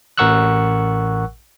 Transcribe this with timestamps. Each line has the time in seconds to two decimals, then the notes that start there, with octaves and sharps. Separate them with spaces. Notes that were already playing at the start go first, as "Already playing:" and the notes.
0.18 A1 A#4 F#5 C#6 E6 F#6